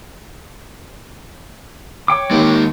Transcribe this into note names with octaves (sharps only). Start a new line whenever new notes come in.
C#5 G5 D6
D#2 G#3 A#4